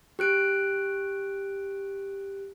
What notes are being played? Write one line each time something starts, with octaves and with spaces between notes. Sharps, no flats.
G4 F#6 D7